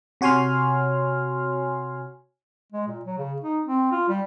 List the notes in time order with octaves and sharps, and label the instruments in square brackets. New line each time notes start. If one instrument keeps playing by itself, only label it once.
[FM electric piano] C3 F#4 C#5 G#5 C6 F6
[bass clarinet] G#3
A#2
F#3
C#3
D#4
C4
F4
G3